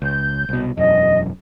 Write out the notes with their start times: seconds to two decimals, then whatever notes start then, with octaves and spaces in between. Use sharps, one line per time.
0.02 C#2 G6
0.49 C2 B2
0.77 E1 F#2 D#5